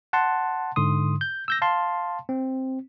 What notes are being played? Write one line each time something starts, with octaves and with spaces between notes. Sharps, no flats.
F#5 A5 C6
G#2 D3 C6 D#6
G6
E6 G6 A#6
F5 A5 C6
C4